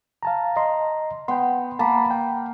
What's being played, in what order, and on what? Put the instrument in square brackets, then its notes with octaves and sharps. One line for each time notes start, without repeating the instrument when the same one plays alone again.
[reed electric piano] F5 A5 A#5
D#5 A#5 C6
[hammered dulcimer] B3 [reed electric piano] G5 C6
[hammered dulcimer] A#3 [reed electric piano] A5 B5
[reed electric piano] G5